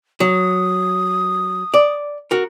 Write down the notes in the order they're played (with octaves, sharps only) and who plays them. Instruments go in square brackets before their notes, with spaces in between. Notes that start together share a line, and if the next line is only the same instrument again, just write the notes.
[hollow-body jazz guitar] F#3 [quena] D#6
[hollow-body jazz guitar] D5
F#4 A#4